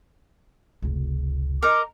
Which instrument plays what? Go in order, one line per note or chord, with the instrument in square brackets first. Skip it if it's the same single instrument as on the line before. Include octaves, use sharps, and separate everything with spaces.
[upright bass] F1 C#2
[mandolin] D#4 A#4 [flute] D6